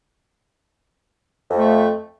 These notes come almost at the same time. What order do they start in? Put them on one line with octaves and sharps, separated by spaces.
F2 F3 A3